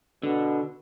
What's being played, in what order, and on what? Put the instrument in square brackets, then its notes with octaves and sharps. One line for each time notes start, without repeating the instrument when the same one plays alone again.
[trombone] B2 [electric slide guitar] D3